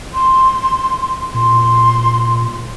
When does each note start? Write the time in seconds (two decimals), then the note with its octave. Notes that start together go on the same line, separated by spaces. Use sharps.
0.14 C6
1.34 A#2 C6